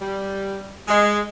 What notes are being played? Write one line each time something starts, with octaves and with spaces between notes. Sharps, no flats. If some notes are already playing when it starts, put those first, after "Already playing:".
G3
G#3